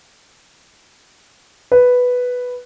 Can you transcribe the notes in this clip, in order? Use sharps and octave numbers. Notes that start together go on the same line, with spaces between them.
B4